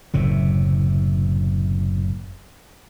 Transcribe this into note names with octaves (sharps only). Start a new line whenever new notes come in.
F#1 A2 C3